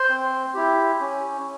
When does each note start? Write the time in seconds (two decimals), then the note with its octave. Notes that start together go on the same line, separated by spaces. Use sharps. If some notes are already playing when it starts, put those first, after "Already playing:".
Already playing: C5 C6
0.09 C4
0.54 E4 G4
1.01 C#4